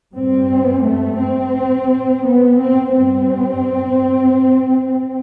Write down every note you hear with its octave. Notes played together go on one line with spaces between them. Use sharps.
G2 C4
A3
C4
B3
C4
G2 C4